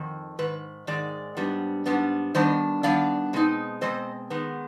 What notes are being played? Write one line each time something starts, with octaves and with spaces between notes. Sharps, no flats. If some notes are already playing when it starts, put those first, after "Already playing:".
Already playing: F2 D#3
G#2 D#3 B4
G#2 D#3 G#3 D5
G#2 G3 B3 D4
G#2 G3 B3 D4
D#3 G3 B3 D4 C5 D#5
D#3 G3 B3 D4 D5 F5
B2 G#3 C4 D#4
B2 G#3 C4 C5 D#5
D#3 G#3 B3